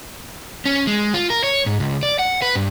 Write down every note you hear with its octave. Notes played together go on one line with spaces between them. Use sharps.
C#4
G#3
F4
A#4
C#5
G#2
C#2
D5
F#5
B4
G2